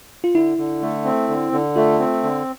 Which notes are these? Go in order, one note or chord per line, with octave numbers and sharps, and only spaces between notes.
F4
D3 E4
D3
A3
C4
D3
D3
A3 F4
C4
D3